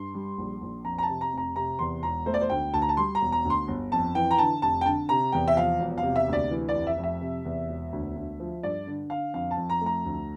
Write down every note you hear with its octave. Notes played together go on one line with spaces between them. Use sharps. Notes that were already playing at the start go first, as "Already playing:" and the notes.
Already playing: G2 C6
G3
A#1
A#1
F2 A#5
A#5
A5
C3
A#5
F1 A#5
C3 A#5
E2 C6
E1 A#5
A3 C5
D5
C5
D2 G5
D2 A5
A#5
A5
G3 C6
A#5
E1
A#5
D2
C6
G1
F2 A5
E3 G5
A#5
D3 A5
F1 A5
G5
D3 A5
C3 A#5
E2 G5
E5
F3 F5
E1
F5
C3
E5
D2
D5
E3
D5
F1
E5
F2
E5
C3
E2
E1
D2
D2
F3
G2 D5
D3
D3 F5
F2 F5
A5
F2
A#5
A3 A#5
D2